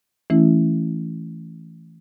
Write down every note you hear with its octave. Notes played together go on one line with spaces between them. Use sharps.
E3 A3 C#4 E4